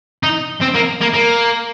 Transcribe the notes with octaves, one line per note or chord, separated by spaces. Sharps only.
D#4
C4
A#3
A#3
A#3